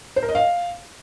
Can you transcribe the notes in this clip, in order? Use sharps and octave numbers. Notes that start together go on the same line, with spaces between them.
C5
A#4
D#5
F5